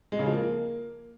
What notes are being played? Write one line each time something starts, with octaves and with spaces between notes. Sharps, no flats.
G#3
C#3
F3
A#3